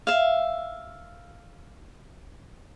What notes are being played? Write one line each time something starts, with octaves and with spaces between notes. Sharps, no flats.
E5 F5